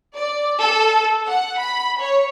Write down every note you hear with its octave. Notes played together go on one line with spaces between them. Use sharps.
D5
A4
F#5
B5
C#5